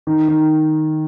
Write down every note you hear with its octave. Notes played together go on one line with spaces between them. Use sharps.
D#3
D#3